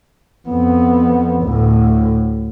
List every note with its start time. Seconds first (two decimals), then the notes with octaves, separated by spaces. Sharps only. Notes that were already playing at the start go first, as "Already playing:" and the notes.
0.48 F2 B3
1.43 D2 A2